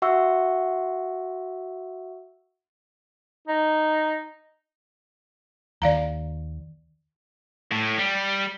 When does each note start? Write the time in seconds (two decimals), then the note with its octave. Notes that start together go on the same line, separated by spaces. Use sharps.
0.02 F#4 E5 F#5 C#6 E6
3.48 D#4
5.82 D#2 D#3 D5 F5 A#5
7.72 A2
7.98 G3